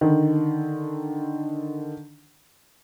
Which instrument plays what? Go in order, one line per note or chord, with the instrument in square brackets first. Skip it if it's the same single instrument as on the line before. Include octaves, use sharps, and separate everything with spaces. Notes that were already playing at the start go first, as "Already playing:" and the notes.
[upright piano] D3 D#3